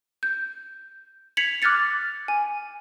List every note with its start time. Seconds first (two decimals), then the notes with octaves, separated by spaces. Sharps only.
0.23 G6
1.37 G#6 B6 C#7 F7 F#7
1.62 D6 F6 F#6 G#6 A6 C#7
2.28 G#5